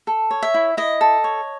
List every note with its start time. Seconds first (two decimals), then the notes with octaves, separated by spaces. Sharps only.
0.07 A4
0.31 C#5
0.42 E5
0.54 E4
0.77 E4 D#5
1.01 A4
1.24 C#5